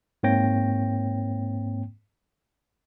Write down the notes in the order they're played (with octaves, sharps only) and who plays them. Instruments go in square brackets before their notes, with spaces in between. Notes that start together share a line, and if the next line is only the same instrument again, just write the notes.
[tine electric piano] G#2 A#3 C4 C#5 G5 A#6